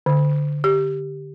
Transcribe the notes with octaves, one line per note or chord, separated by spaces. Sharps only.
D3
G4